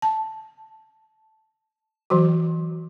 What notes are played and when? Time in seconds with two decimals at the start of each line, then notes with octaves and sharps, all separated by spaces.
0.02 A5
2.10 E3 F#3 F#4